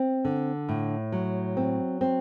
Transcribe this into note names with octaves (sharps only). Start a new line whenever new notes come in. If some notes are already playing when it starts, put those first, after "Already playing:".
Already playing: C4
D3
A2
F#3
C4
C4